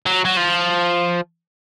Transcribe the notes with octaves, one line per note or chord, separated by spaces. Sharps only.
F#3
F#3
F3